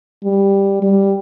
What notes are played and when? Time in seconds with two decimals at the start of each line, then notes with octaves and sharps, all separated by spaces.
0.24 G3
0.82 G3